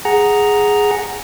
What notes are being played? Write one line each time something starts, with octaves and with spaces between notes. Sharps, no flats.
G#4 F#5 A#5